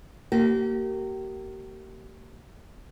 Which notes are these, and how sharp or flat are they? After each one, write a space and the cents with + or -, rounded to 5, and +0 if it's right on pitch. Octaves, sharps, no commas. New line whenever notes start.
A#3 -25 G4 -40